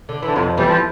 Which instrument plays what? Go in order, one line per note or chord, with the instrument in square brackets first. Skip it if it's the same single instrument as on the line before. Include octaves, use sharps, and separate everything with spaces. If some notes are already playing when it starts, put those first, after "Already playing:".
[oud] D3
[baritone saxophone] D3 [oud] E3
[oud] F2 F3 [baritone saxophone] C3
[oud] E2 E3 [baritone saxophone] G3
[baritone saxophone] F3